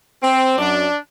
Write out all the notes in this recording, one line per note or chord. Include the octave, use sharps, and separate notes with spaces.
C4
F#2 F#3 D4